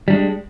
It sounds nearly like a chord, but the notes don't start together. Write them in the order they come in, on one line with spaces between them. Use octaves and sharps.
G3 D4 G#3